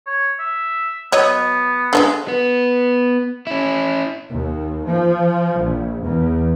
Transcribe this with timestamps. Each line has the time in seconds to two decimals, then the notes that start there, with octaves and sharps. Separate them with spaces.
0.06 C#5
0.39 E5
1.12 F#3 B3 C#5 D#5
1.93 D3 F3 G#3
2.28 B3
3.47 C#4 E4
4.31 D#2
4.87 F3
5.59 A#1
6.04 E2